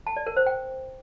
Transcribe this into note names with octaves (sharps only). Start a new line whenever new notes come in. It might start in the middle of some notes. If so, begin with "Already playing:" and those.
A5
D5
A#4
C5
G5